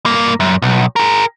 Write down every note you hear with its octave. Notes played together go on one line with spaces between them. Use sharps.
G2 A#3
F#2
B1
G#4 A#4